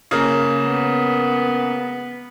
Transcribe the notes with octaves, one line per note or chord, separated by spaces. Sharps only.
C#3 A#3
B3